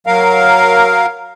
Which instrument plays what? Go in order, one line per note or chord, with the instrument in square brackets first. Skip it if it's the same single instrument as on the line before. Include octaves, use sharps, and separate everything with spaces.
[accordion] F#3 A#4 F5